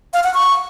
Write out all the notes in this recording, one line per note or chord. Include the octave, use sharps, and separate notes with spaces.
F5
F#5
C#6